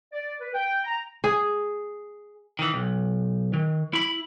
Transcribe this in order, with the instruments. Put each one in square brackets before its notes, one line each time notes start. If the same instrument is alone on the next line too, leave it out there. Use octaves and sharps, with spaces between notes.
[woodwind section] D5
B4
G5
A#5
[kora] G#4
[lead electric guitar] D#3 E3
B1
D#3
E4 B5